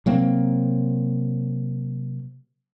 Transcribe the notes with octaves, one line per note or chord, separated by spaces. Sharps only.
C3 F#3 A#3 C4